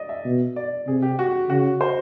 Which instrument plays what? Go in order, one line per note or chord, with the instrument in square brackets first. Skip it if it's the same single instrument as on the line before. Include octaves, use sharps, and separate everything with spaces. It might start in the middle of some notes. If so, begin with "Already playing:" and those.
Already playing: [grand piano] D5 D#5
E5
[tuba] B2
[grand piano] D5
[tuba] C3 [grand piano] G#4
[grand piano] G4
F#4
[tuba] C#3 [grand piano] F#4
[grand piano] C5